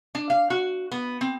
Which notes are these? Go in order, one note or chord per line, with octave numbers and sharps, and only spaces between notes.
D4
F5
F#4
B3
C4